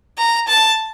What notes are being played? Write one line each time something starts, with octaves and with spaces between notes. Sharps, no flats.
A#5
A5